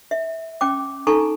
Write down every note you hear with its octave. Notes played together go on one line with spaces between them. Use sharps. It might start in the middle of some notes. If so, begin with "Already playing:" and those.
E5
C#4 G5 D6
D#4 A4 G#5 A#5 C#6